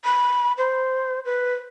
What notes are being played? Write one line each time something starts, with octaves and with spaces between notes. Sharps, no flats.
B5
C5
B4